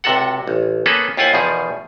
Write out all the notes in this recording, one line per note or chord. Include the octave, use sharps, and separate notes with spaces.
C#2 C3 F#4 A4 F#5
A1
A#3 B3 C#4 G#4 A4 B4
D#2 E4 F4 C5 F#5 G#5
E2 B2 D#3 F3 G#4